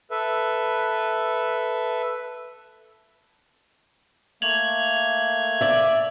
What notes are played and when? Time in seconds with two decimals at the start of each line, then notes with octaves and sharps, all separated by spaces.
0.11 A4 B4 E5
4.42 A3 A#3 G#6 F7 F#7
5.61 D5 E5